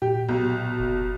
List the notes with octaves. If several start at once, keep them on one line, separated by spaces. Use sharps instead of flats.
A#2 G4
B1
F#1